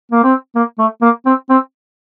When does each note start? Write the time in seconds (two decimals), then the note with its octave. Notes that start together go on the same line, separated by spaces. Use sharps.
0.11 A#3
0.24 C4
0.55 A#3
0.79 A3
1.02 A#3
1.26 C4
1.50 C4